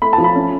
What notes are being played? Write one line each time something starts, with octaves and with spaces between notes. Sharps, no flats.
A3 B5
A5
F3
B5
C#4